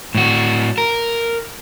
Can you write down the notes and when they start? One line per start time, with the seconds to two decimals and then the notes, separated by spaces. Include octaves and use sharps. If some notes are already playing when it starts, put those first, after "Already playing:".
0.15 A2 F#4
0.78 A#4